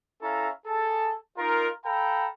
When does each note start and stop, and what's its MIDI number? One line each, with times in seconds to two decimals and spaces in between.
0.22 0.49 61
0.22 0.49 64
0.22 0.49 69
0.22 0.49 76
0.22 0.49 77
0.22 0.49 82
0.66 1.13 68
0.66 1.13 69
0.66 1.13 81
1.37 1.68 63
1.37 1.68 65
1.37 1.68 70
1.85 2.28 69
1.85 2.28 77
1.85 2.28 79
1.85 2.28 82
1.85 2.28 83